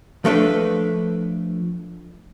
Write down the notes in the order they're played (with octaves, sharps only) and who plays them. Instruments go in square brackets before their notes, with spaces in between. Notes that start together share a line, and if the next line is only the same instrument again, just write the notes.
[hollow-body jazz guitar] F3 A3 D4 B4